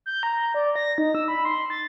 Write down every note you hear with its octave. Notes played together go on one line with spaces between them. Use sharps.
G6
A#5
D5
A#6
D#4
E6
B5
C6
A6